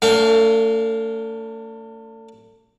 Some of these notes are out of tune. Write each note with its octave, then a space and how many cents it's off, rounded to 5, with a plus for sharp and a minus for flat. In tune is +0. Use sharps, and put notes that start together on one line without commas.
A3 +35 D4 -40 F5 +0